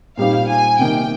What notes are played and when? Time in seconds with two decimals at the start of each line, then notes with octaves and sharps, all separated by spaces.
0.17 A#2 G3 C4 D#4 G4 F5
0.48 G#5
0.79 C3 D#3 A#3 D#4 G5